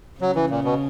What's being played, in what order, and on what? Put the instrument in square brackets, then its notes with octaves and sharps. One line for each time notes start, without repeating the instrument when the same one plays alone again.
[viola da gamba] C#3 [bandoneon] F#3
[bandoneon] E3
A#2
B2